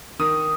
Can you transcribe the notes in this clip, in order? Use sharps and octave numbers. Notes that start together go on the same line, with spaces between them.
D#3 D#6